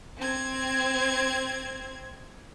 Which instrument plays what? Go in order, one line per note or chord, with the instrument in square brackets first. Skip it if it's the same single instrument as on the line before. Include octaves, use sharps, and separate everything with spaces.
[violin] C4 G#6